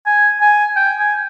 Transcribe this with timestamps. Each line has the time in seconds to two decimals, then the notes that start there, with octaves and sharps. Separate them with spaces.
0.06 G#5
0.41 G#5
0.76 G5
0.99 G#5